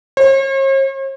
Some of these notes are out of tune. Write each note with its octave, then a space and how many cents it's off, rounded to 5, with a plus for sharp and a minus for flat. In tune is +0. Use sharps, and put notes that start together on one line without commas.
C#5 -45